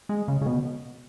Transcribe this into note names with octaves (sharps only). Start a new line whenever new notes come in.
G#3
C#3
C#3
B2